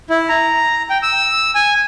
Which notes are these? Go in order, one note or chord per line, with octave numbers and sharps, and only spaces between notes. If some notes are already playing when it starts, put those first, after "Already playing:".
E4
A#5
G5
E6
G#5